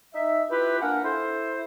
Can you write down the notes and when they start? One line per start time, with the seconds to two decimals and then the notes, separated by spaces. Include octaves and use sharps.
0.14 D#4 E5
0.50 E4 F4 G4 B4
0.81 A#3 D4 A#4 F#5 G#5
1.04 E4 A4 C5